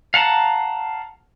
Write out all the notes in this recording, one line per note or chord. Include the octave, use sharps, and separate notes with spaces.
F5 F#5 A5 A#5